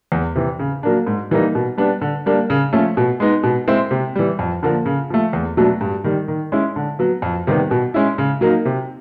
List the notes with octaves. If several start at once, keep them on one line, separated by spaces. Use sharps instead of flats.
E2
C3 E3
C#3
F#3 A#3 D4
G#2
E3 G3 A#3 D#4
B2
G3 B3 D4
D3
G3 A#3 D4
C#3
F3 A3 C#4
B2
G#3 B3 D#4
B2
G#3 C4 E4
C3
E3 G3
F2
D3 F3 A#3
C#3
F3 A3
E2
B2 F#3 A3 D4
G2
D#3 G3
D#3
G#3 C#4 E4
D3
F#3 B3
F2
C3 D#3 G3 B3
B2
G#3 C#4 E4
C#3
F#3 A#3 D#4
C3